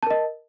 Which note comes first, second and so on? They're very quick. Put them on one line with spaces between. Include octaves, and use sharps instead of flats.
A5 A#4 D#5